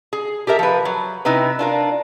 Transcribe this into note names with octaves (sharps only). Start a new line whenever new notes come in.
G#4
G4 A4 A#4 E5
F3 B4
F#3
C3 D#4 E4 B4
D4 F4 A#4